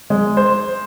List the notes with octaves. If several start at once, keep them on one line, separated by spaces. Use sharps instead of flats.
G#3
C5